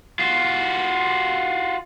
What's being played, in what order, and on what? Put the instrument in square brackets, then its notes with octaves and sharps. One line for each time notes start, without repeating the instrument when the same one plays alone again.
[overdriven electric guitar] F4 F#4